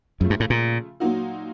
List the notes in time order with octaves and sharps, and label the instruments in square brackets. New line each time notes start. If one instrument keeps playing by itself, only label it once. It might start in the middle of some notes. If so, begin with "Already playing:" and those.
[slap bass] F#2 [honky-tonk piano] C#3 F3 A3
[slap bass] G2
A2
A#2
[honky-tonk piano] A#2 F#3 A#3 D#4 F#4